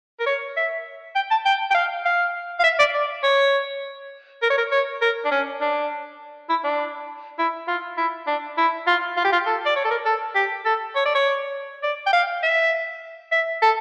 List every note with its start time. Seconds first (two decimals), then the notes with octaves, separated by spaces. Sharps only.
0.20 A#4
0.26 C#5
0.57 E5
1.15 G5
1.31 A5
1.45 G5
1.70 G5
1.75 F5
2.05 F5
2.59 F5
2.64 E5
2.79 D5
2.94 D5
3.23 C#5
4.42 A#4
4.50 C#5
4.58 A#4
4.71 C#5
5.01 A#4
5.25 D4
5.32 C#4
5.61 D4
6.49 E4
6.64 D4
7.39 E4
7.68 F4
7.97 E4
8.27 D4
8.58 E4
8.87 F4
9.17 F4
9.25 G4
9.33 F4
9.46 A4
9.66 D5
9.76 C#5
9.85 A4
9.91 A#4
10.05 A4
10.35 G4
10.65 A4
10.95 C#5
11.05 D5
11.15 C#5
11.83 D5
12.06 G5
12.13 F5
12.43 E5
13.32 E5
13.62 A4